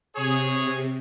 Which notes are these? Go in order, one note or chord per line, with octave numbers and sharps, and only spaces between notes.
C3 G#4 C#5